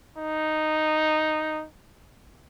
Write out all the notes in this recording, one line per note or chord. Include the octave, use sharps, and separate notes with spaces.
D#4